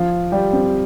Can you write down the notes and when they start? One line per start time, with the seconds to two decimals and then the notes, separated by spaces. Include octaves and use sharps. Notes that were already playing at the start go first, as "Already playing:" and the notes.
Already playing: F3 F4
0.32 G3 G4
0.53 C4